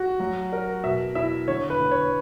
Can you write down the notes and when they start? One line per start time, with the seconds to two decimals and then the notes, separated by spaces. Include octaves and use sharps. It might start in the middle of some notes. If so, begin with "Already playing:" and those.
Already playing: F#4
0.20 F#3
0.53 A#4
0.83 B2 E5
1.15 E4 E5
1.47 D3 C#5
1.70 B4
1.80 D3
1.91 C#5